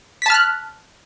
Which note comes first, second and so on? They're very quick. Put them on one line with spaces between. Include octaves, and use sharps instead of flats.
B6 A5 F6 F#6